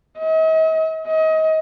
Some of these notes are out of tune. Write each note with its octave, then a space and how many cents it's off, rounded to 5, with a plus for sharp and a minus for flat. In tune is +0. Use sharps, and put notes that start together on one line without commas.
D#5 +45
D#5 +30